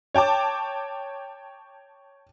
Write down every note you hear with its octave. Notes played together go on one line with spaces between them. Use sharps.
C#5 G5 A5 D6